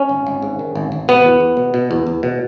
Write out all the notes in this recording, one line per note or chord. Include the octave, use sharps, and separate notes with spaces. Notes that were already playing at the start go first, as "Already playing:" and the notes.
Already playing: C#4
G#1
G#1
G#2
D#3
G#1
G#1
B2 B3
E2
E2
B2
B2
E2
E2
B2